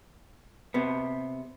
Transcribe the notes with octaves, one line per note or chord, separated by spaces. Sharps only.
C3 B3